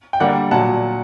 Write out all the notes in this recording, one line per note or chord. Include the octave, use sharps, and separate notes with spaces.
G5
D3 G3 A#3 D5 F#5
A#2 F#3 F#5 A5